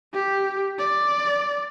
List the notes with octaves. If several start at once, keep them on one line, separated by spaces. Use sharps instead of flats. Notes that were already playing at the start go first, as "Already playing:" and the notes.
G4
D5